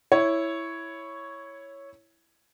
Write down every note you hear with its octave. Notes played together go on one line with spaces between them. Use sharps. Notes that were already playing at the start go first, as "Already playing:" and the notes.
E4 C#5